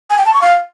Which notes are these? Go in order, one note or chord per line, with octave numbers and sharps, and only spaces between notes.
G#5
G5
A5
C#6
F5